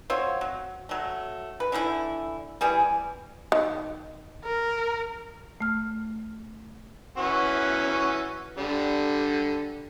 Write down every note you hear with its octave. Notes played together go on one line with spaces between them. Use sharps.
C4 F4 F#4 C#5
F#3
F#3 A3
B4
D3 E3 A3 E4
E3 G3 G#4
D#3
A#4
A3 F6
E3 C#4 F#4
D3 G3